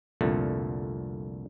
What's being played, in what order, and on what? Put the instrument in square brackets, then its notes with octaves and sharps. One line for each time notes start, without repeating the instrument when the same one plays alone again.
[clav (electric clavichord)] C2 F2 A#2 D3 A3